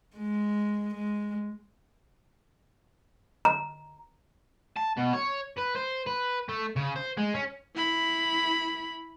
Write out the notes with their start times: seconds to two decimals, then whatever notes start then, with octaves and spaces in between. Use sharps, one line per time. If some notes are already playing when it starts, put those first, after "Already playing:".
0.17 G#3
0.95 G#3
3.45 A#5
4.77 A5
4.97 B2
5.13 C#5
5.57 B4
5.75 C5
6.06 B4
6.49 A3
6.76 C#3
6.96 C5
7.18 G#3
7.34 C#4
7.75 E4 B5